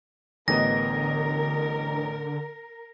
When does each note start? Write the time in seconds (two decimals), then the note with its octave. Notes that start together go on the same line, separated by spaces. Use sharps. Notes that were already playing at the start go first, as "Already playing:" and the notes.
0.48 A1 D3 B3 A#4 D#5 A#6